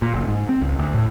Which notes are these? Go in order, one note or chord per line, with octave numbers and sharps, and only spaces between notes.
A#2
F#1
G#2
C4
C#2
D2
A2